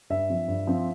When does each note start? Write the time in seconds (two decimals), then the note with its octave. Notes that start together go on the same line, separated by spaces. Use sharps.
0.10 G2 E5
0.30 F3 C4
0.48 G2
0.67 F3 C4